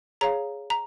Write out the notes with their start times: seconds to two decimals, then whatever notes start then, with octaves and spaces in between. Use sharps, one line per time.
0.21 G#4 C#5 F5 A#5
0.70 A#5